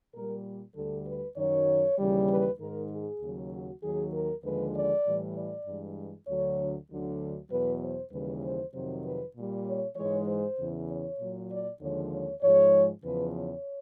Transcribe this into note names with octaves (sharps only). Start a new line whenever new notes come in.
A#2 G3 A#4
D2 D3 G3 A4
B4
F#2 D#3 F#3 C#5
D#2 C#3 E3 G3
B4
G#2 D#3 G#3 A#4
G#4
D#2 C#3 F#3
F#4
D#2 D#3 F#3 G#4
A#4
D#2 D3 F3 G#3 B4
D5
A2 E3 G3
D5
G2 E3 G#3
D2 D3 F#3 C#5
D2 D3 F#3
E2 B2 F#3 B4
C5
D#2 C#3 E3 G3 B4
C5
F2 C3 D#3 F#3 C5
B4
A#2 G3
C#5
G#2 E3 G#3 C#5
C5
E2 C#3 E3
C#5
A#2 F#3
D5
D#2 D3 F3 G#3 C#5
C#5
G#2 F3 G#3 C#5
E2 C#3 F3 B4
C#5